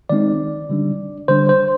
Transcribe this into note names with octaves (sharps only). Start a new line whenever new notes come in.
D#3 G#3 C4 D#4 D5
D3 G3 D4
D3 G3 D4 C5
C5